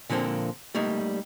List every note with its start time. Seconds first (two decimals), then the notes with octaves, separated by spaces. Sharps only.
0.10 A#2 D3 F3 A#3 C4
0.75 G3 A3 A#3 D#4